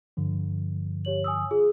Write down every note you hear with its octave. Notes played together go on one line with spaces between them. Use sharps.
G2 D3 F3
G4 C#5 F#7
G#5 D#6 E6
F4 G#4